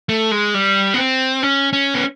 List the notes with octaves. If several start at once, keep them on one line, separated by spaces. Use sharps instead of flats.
A3
G#3
G3
B3
C4
C#4
C#4
B3